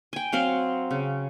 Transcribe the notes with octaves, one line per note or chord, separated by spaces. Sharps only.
G5 G#5
F#3 C4 F5
C#3